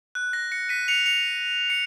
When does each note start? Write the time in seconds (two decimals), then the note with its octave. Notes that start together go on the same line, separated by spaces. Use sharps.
0.15 F#6
0.33 A#6
0.52 A#6 C#7
0.69 B6 D#7
0.88 C#7 F7
1.06 C#7 F7
1.70 C#7